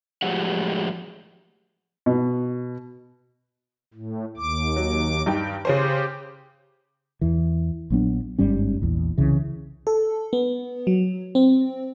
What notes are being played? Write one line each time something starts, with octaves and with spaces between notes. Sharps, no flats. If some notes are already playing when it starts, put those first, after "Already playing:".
A2 F3 F#3 G#3 G4 F#5
B2
A2
D#2 D6
F#3
G2 D#4 G5
C#3 C#4 G4 C5
E2 E3
A#1 F#3 B3 D4
G1 G#2 G3 C#4
A#1 E2
C2 C#3 E3
A4
B3
F#3
C4